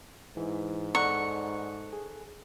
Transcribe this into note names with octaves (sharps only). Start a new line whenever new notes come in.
G#2 E3
A4 D5 F#5 A#5 C#6 F#6
G#4